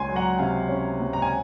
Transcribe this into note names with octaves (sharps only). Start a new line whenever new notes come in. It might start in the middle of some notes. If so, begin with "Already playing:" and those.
Already playing: C#2 C#4 G#5 C6
F#3
F#5 A#5
C3 F5 G#5
C#4
C#2
A#5
G#5